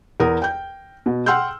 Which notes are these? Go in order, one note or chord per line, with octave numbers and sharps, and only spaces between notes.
E2 A#4 D#6
G5 G6
B2
F#5 G5 C6 E6 F6 G6